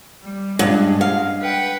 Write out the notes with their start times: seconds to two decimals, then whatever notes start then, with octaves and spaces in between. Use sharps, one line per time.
0.22 G3
0.59 G2 G#3
1.01 F5
1.41 B4 F#5 G5